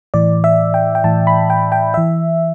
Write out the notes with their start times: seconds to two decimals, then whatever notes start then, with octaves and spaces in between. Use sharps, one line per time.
0.14 A2 E3 D5
0.44 E5
0.74 G5
0.95 G5
1.04 A2 E3 A5
1.27 B5
1.50 G5
1.72 G5
1.94 E3 E5